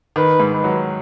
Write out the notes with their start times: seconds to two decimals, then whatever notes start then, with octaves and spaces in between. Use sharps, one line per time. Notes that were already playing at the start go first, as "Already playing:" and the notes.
0.16 D#3 B4
0.40 G#2
0.53 B4
0.64 F#3